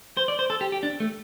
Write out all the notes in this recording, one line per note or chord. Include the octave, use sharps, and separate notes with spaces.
C5
D5
C5
A4
G4
G4
D4
A3